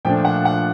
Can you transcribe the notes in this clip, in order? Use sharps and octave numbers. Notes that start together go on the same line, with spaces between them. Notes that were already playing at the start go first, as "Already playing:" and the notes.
A#2 F3 A3 D4 G5
F#5
F#5